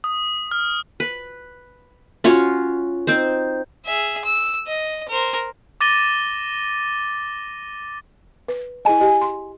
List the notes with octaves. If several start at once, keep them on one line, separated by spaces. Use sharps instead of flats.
D#6
F6
B4
C#4 F4 F#4 C#5
C4 D#4 C5
G#4 E5
E6
D#5
A#4 C5
D6 A6 A#6 D#7 G7
B4
E4 G#4 D#5 G#5
G4 D#5
C6